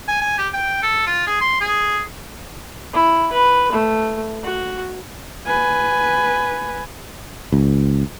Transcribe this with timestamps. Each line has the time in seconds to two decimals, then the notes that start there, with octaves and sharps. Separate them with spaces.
0.08 G#5
0.21 G#5
0.38 G4
0.53 G5
0.82 A4
1.07 F4
1.27 G#4
1.41 C6
1.61 G#4
2.93 E4
3.32 B4
3.73 A3
4.44 F#4
5.46 B4 G#5
7.52 C#2